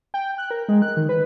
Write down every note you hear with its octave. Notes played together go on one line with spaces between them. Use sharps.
G5
F#6
A#4
G#3
F#6
D#3
B4